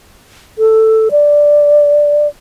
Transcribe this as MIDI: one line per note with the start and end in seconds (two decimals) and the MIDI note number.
0.58 1.09 69
1.11 2.27 74